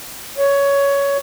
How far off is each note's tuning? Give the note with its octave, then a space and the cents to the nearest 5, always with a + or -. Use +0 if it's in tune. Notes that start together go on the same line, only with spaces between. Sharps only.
C#5 +15